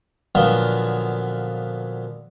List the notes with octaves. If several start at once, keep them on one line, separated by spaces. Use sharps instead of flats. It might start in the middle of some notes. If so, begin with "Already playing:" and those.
A#2 D3 F3 F#3 B3